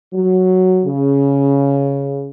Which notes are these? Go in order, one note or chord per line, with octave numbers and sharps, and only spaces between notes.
F#3
C#3